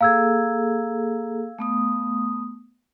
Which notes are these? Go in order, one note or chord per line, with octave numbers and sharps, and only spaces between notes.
A#3 G#4 A4 F5 E6 G#6
A3 B3 D#6